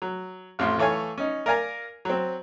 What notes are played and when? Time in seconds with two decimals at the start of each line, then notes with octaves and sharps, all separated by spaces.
0.02 F#3
0.59 A1 F2 C6
0.78 E3 A3 C#5 F5 G#5
1.18 C#4 D#4
1.46 A#4 D5 F5 G#5 A#5
2.05 F#3 C4